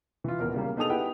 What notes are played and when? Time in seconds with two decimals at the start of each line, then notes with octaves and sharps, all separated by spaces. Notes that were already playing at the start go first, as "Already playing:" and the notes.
0.24 E3 F4
0.39 D#1 B3 A#4
0.54 C#3 G3 A#3
0.76 B3 D#4 G#4 A4 D#6 F7
0.90 E4 G4 B4 F#5 G5